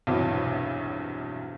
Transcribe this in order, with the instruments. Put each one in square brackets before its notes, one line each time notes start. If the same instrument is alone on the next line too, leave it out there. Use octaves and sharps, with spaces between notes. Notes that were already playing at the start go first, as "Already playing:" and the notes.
[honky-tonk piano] B1 E2 G2 C3 E3 F#3